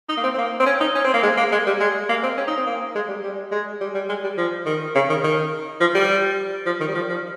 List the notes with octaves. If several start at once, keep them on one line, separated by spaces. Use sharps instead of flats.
D#4
A#3
C4
C4
A#3
C4
C#4
D#4
C#4
C4
A#3
G#3
A#3
G#3
G3
G#3
A#3
C4
C#4
D#4
C4
A#3
G#3
G3
G3
G#3
G3
G3
G#3
G3
F3
D#3
C#3
D#3
D#3
F3
G3
F3
D#3
G3
F3
F3